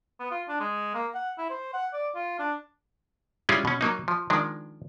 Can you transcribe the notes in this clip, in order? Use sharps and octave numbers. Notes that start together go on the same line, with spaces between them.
B3
F4
D4
G#3
A#3
F#5
E4
C5
F#5
D5
F4
D4
G3 G#3 C#4 E4 F4 G#4
B2 C#4
F#3 A#3 D#4
F3
D#3 F3 G#3 D4